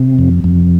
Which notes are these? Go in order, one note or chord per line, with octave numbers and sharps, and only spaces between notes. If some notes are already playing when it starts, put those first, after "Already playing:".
Already playing: C3
F2
F2